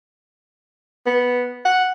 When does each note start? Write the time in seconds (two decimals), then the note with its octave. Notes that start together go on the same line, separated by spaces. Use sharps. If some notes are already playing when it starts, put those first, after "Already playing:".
1.06 B3
1.65 F#5